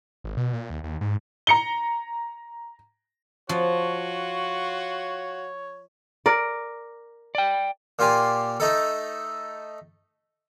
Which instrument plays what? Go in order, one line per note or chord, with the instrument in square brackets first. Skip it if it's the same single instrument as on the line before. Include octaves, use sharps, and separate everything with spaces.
[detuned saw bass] G#1
B2
A#2
D#2
D#2
G#2
[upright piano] A#5 C#7 G7
[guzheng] F3 [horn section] F4 F#4 [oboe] C#5
[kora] A#4 D5
[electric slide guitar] D5 G5
[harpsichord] A#2 F4 G4 G#5
A3 D#4 A4